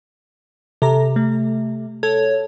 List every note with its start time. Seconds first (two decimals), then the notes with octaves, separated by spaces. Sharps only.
0.82 C3 A4 A#5
1.16 A3
2.03 A4 C#5